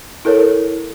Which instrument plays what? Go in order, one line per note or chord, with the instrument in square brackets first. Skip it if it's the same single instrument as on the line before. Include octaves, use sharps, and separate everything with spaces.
[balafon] E4 A4 A#4 C#5